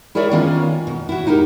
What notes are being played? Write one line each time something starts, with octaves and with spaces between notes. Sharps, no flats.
E4 G#4 A#4 C#5 D5 E5
D#3 A#3 B3 C#4 F4
B2
E4 F#4
D#4 E4 G4 A#4